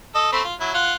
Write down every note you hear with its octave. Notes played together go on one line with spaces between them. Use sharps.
A4 D#5
A3 C4 B5
F4
F#3 E4
F4 F#5